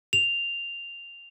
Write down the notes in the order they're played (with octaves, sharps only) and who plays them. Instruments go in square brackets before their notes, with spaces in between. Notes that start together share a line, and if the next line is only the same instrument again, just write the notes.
[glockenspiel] F7